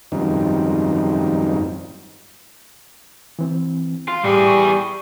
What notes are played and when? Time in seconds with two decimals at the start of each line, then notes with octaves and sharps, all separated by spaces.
0.12 F#2 D#3 F3 G3 C4 D#4
3.39 E3 C4
4.08 F4
4.24 A2 E3 G3 G#4
4.46 C#6